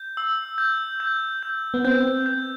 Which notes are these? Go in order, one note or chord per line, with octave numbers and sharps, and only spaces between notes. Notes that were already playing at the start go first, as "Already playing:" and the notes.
Already playing: G6
E6
G6
G6
G6
B3
C4 G6
G6